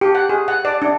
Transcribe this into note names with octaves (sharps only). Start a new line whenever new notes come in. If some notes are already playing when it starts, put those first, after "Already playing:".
G4
F#5
G#4
F#5
D5
D4